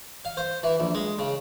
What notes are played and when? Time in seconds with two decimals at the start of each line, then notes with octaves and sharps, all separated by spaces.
0.25 F5
0.37 C5
0.63 E3
0.80 A#1
0.95 G#3
1.19 C#3